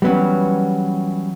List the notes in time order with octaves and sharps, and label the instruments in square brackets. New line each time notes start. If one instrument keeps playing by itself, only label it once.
[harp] E3 F#3 [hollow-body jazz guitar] G3 B3 C#4